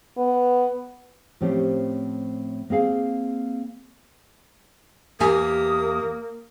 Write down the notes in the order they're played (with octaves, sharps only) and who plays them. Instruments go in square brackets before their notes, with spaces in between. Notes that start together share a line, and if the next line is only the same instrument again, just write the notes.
[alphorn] B3
[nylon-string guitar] A2 F3 C4 C#4 G4 C#5
A#3 C4 G#4 F5
[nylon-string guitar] E2 G4 G#5 [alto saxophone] A#3 [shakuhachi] D#6